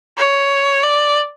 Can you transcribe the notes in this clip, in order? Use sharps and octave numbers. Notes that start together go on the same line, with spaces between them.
C#5
D5